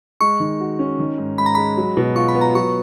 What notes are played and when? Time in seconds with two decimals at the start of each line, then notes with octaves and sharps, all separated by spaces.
0.20 G#3 C#6
0.40 D#3
0.60 F#4
0.79 C#4
0.99 D#3
1.18 G#2
1.38 G#2 B5
1.46 A#5
1.55 G#3 B5
1.77 F#3
1.97 B2
2.16 F4 C#6
2.28 B5
2.35 B3
2.41 A#5
2.55 F#3 C#6